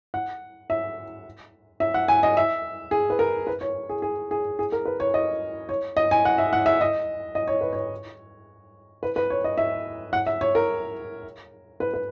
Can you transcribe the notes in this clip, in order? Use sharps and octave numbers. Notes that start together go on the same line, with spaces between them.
F#5
E5
E5
F#5
G#5
D#5
E5
G#4
B4
A#4
B4
C#5
G#4
G#4
G#4
G#4
A#4
B4
C#5
D#5
C#5
D#5
G#5
F#5
E5
F#5
E5
D#5
D#5
C#5
B4
C#5
B4
B4
C#5
D#5
E5
F#5
E5
C#5
A#4
B4
B4